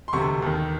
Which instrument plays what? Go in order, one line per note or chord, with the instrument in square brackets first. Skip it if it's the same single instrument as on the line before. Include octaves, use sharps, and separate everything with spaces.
[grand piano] C6
E1 D2 C3 C#6
D#2 D#3